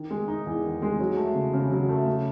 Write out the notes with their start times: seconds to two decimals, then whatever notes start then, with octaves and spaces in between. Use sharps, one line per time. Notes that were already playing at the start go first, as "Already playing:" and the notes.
Already playing: D#3
0.11 G#3
0.28 D#4
0.46 E2
0.64 D#3
0.82 G#3
1.00 F#3
1.17 A3
1.35 C#3
1.53 C#3
1.71 F#3
1.89 A3
2.06 C#3